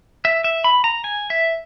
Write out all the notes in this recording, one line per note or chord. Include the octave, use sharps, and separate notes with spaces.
E5
E5
B5
A#5
G#5
E5